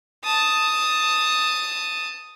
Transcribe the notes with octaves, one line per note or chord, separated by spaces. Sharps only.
A5 D#6